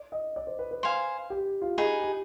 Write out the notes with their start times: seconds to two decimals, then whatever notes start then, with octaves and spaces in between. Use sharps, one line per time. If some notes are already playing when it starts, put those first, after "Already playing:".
Already playing: D5
0.12 D#5
0.36 D5
0.47 C5
0.59 B4
0.71 B4
0.83 C5 F5 G#5
1.30 G4
1.62 F4
1.78 D#4 G4 G#4 B4
2.02 G4